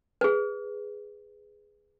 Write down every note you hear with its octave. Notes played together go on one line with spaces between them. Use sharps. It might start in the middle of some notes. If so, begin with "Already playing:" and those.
G#4 B4